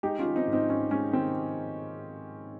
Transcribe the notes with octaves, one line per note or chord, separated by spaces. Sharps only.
G#3 D#4 G4
C#4 F4
D#3
C4 D#4
G#2
C4 D#4
G#2 C#4
G#3 C#4
D#3 C4